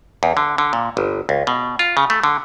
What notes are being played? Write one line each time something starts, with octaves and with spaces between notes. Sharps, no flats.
E2
D3
D3
A#2
G1
C#2
B2
F4
C#3
A3
D3